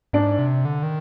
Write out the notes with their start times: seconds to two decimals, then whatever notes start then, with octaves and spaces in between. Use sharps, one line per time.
0.13 G#2 D4
0.39 C3
0.65 D3
0.83 D#3